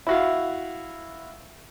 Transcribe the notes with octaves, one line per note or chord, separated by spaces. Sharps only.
E4 F#4 F5